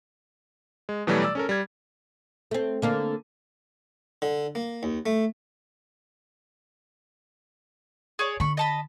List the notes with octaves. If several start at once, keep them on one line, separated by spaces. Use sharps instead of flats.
G#3
B2 E3 F#3 G3 A3
D5 E6
C#4 A4 A#4
G3 G#6
A3 C4
D3 A#3 D4
D3
A#3
D#2
A3
G#4 C#5 D5
D3 B5 C#6
D#5 A5 B5